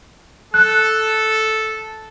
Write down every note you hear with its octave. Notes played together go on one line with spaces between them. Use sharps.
A4 F#6